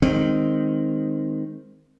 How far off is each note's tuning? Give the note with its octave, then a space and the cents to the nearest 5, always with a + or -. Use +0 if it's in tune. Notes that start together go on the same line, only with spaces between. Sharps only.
D#3 +0 G#3 -5 C4 +0